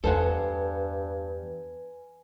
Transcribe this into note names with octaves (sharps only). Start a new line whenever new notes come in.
E2 G2 A4 B4 C5 F#5 G#5